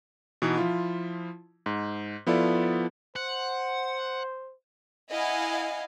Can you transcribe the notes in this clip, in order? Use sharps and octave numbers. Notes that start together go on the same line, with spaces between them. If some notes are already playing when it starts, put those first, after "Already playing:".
B2 E3 B3 D#4
F3 E4 F4
G#2
F3 B3 E4 F4 A4 D5
C5 F#5
E4 D#5 F5 F#5 G#5